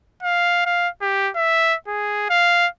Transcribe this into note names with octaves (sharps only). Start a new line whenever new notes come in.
F5
F5
G4
E5
G#4
F5